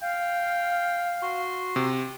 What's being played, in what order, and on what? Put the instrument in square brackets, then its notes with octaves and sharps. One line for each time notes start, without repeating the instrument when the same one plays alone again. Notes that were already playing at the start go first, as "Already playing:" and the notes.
[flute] F5 [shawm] G5
[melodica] F#4 C6
[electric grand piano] C3